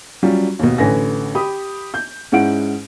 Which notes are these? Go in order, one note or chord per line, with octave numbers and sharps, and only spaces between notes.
F#3 G3 C#4 F4
D#2 B2
A1 D3 B4 G#5 A#6
G4 B5 D#6
G6
G#2 C#4 E4 F#5 D7